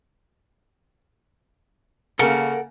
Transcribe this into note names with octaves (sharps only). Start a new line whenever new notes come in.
C#3 A#3 A4 A#4 F#5